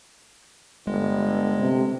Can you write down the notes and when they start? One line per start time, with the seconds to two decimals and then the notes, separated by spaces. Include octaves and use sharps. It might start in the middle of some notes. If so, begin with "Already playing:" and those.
0.87 G1 G#3
1.61 C3